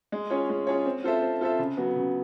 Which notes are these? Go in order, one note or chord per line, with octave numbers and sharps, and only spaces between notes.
G#3
C#4 F4 G#4 C#5
G#3
C#4 F4 G#4 C#5
C4
F4 A4 C5 E5
C4
F4 A4 C5 E5
C#3
F#3 B3
C#3